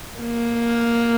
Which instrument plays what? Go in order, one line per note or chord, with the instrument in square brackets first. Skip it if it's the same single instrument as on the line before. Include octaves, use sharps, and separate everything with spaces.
[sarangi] A#3